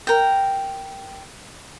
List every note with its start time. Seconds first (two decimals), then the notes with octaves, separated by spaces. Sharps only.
0.07 A#4 G5